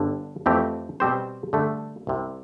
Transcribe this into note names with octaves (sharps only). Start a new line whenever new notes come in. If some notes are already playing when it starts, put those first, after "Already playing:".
Already playing: G1 G2 D3
F2 E3 A3 C4 G4
B2 G3 C4 G4 C5
G2 D3 A3
C2 C3 G3